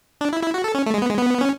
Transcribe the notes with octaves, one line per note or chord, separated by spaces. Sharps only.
D4
E4
E4
F#4
A4
C#4
A3
G#3
B3
G#3
B3
C#4